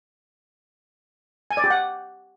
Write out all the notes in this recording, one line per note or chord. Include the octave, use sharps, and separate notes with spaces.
G#5
D5
G4
F#5